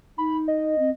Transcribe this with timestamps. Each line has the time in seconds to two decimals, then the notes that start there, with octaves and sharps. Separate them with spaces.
0.18 D#4 B5
0.48 D#5
0.79 C4